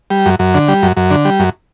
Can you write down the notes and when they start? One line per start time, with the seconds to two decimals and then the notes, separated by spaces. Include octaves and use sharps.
0.10 G3
0.26 F#2
0.39 F#2
0.54 D3
0.68 G3
0.83 F#2
0.97 F#2
1.11 D3
1.25 G3
1.39 F#2